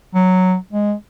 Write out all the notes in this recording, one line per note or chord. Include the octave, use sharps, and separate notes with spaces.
F#3
G#3